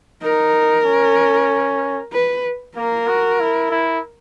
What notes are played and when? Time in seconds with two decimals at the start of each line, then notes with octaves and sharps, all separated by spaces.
0.22 D#4 A#4
0.86 C#4
2.13 B4
2.76 A#3 A#4
3.08 F#4
3.40 E4
3.71 E4